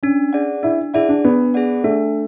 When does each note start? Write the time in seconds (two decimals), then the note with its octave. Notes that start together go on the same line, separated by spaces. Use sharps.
0.03 C#4 D4
0.33 G#4 D5 F#5
0.63 D4 E4
0.94 E4 G#4 D5 F#5
1.09 D4
1.25 B3 D4
1.54 G#4 D5 F#5
1.84 A3 D4